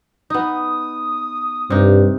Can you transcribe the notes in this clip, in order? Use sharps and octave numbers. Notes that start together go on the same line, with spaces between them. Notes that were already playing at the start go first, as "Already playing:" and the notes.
B3 D#4 D#6
G2 C3 D#4